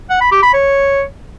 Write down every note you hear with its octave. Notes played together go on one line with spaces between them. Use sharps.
F#5
B5
G4
B5
C#5